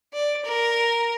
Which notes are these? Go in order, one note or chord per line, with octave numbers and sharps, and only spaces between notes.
D5
A#4